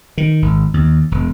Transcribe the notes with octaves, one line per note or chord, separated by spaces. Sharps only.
D#3
G#1
D#2
E1